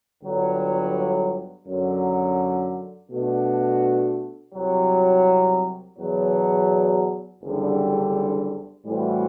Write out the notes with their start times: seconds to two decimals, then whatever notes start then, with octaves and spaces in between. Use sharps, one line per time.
0.22 G1 G2 D3 F#3
1.67 F#2 D3 F#3
3.10 B2 A3 D4 F#4
4.54 C2 C3 F#3
5.98 E2 B2 F#3
7.42 F#1 E2 D3 G3 D4
8.86 A2 E3 G3 C4 F#4